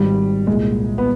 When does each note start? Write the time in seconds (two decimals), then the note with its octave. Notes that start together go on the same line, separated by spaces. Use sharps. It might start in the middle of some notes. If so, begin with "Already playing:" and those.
Already playing: G#1 G#2 D#3 G3
0.47 C2 A#2 G#3
0.98 B3